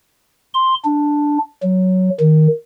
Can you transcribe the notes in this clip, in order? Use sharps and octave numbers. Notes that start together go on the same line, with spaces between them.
C6
D4
F#3
D#3